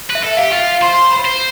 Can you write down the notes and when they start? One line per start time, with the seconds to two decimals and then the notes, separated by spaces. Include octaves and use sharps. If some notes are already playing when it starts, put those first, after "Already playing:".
0.10 B4 E5
0.23 A4
0.37 G4 F5
0.52 F4
0.59 F5
0.82 C5 C6
1.11 B5
1.25 C5